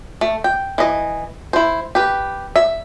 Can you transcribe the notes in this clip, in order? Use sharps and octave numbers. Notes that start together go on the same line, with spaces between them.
A3
G5
E3 D#5
E4 C5
G4 B4
E5